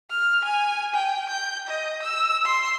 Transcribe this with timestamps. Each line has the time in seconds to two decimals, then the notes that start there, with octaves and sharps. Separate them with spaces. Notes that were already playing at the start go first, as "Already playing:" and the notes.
0.10 F6
0.45 G#5
0.94 G5
1.29 G6
1.68 D#5
2.03 E6
2.45 C6